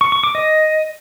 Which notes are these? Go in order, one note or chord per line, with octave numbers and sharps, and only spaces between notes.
C#6
C#6
D6
D#5